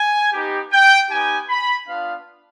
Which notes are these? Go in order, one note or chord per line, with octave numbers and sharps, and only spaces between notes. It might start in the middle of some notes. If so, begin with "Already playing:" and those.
Already playing: G#5
B3 D#4 G4
G5
B3 D#4 G4 G#5
B5
B3 D4 F4 F5